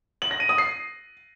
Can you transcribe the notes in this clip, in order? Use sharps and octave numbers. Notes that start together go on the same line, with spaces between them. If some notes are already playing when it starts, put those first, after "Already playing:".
F#7
A#6
D#7
D#6
C7